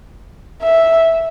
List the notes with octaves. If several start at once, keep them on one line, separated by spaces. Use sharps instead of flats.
E5